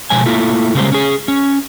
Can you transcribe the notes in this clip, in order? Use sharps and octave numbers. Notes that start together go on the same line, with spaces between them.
B2 F3 G#3 C#5 G#5
A3 A#3 E4 F4
C#3 G3 G#3 A#3 C5
C#4 G#4
C#4